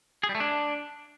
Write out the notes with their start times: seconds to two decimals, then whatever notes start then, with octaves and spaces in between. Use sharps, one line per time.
0.23 G#4
0.29 G3
0.35 A3
0.40 D4